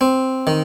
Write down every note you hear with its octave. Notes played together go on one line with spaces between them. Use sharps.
C4
D#3